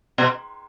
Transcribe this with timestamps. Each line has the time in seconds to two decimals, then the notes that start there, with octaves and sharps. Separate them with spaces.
0.18 B2